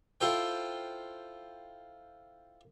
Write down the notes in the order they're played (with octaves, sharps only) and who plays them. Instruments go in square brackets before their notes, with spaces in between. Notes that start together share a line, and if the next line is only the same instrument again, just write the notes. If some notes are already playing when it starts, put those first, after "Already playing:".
[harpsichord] E4 F4 A4 C5 G5